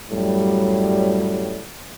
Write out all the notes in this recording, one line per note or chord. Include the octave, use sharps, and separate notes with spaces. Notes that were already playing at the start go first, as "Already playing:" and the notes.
F#2 A2 F#3 G3